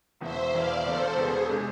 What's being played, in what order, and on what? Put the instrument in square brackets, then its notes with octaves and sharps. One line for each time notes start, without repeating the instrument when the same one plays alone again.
[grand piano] E1 E2 B2 [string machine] C5 E5
[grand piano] E1 E2 B2 [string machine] D5 F5
[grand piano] E1 E2 B2 [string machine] A4 C5
[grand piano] E1 E2 B2 [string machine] G#4
[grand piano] C3 G#3 D4 A4